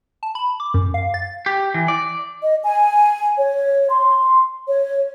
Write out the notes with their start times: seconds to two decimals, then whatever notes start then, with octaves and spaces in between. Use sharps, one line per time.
0.23 A5
0.35 B5
0.60 D6
0.74 F#2
0.94 F5
1.14 A6
1.46 G4
1.74 E3
1.88 D5
2.42 D#5
2.63 G#5
3.38 C#5
3.89 C6
4.67 C#5